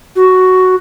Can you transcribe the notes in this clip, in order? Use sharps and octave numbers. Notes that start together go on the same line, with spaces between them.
F#4